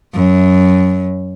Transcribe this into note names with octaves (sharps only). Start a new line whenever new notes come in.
F#2